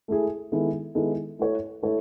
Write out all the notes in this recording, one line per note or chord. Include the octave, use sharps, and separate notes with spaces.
A3 E4 G#4
D#3 G#3 B3 E4 A4
D#3 G#3 B3 E4 A4
A3 E4 A4 C#5
A3 E4 A4 C#5